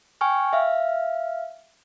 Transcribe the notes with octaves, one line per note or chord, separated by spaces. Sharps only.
G5 G#5 C#6 F6
E5 F5 F6